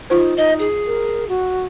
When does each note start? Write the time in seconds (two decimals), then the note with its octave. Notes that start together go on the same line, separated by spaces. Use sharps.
0.10 D#4 F4 C5
0.37 D#4 D#5
0.59 G#4
0.86 A#4
1.28 F#4